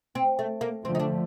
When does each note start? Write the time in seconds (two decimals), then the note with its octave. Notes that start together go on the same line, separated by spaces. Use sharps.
0.15 C4
0.39 A3
0.61 A#3
0.85 D3 F3 A3 C4
0.95 D#4
1.00 D4